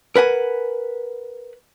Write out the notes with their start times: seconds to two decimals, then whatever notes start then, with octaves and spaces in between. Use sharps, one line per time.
0.16 A#4 B4 F#5 G#5